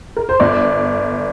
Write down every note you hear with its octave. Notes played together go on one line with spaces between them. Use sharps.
A#4
C5
G1 D5